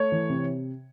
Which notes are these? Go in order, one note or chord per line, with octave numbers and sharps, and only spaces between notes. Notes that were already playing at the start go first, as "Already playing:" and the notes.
Already playing: A3 C#5
E3
C3